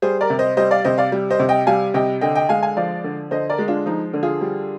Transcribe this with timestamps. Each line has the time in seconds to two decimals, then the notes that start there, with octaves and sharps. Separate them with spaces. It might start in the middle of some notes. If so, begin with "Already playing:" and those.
0.02 G3 G#4 C5
0.21 A#4 D5
0.30 C3
0.39 C5 D#5
0.57 G3 C5 D#5
0.71 D5 F5
0.84 C3 C5 D#5
0.98 D5 F5
1.12 G3
1.30 C5 D#5
1.39 C3
1.49 D#5 G5
1.67 G3 F5 G#5
1.94 C3 D#5 G5
2.21 D3 D#5 G5
2.35 D#5 G5
2.49 G#3 F5 G#5
2.63 F5 G#5
2.77 F3 D5 F5
3.04 D3
3.31 D3 C5 D#5
3.50 A#4 D5
3.58 G#3
3.68 D4 F4
3.86 F3 D#4
4.14 D3
4.23 F4 G#4
4.41 G3